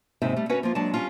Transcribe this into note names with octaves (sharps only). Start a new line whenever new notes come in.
D#2 G#2 C3 D#4 E5
G3 A3
C#4 F#4 A#4 B4 C#5 F#5
F3 A#3 F4
F#3 G#3 D4 A5
G3 C#4 F4